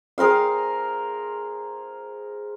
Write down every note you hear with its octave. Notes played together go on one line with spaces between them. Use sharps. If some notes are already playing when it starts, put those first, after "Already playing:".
G#4 A#4 C5 F5